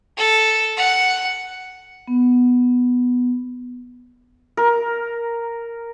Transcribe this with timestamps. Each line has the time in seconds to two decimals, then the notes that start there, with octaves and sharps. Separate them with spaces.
0.18 A4
0.77 F#5
2.08 B3
4.57 A#4